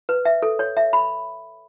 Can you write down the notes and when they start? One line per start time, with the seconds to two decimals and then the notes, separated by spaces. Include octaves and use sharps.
0.09 B4
0.25 E5
0.42 A4
0.59 C#5
0.77 E5
0.93 B5